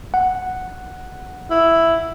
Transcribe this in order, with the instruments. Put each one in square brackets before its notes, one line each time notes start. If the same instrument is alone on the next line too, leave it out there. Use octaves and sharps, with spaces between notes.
[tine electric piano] F#5
[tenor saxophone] E4